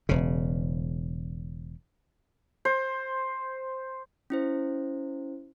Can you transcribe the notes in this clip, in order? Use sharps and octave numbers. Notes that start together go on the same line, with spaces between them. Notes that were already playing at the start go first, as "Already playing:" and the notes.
E1 C#3
C5
C#4 E4 C5